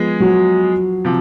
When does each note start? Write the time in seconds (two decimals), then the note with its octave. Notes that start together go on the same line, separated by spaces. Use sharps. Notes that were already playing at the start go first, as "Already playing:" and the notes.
Already playing: F3 G#3 B3 G#4
0.20 F#3
1.05 C3 F3